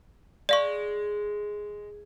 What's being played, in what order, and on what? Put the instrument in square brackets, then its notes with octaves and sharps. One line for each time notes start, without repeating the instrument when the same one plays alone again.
[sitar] G#3 [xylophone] D5 F5 C#6